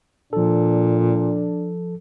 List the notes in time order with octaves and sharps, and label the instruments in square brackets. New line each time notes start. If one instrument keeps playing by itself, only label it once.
[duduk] A#2 [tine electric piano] F3 A4 [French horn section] D4